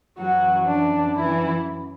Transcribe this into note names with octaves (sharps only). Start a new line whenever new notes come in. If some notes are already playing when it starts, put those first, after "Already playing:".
F#2 E3 F#3 F#4
D4
E3 E4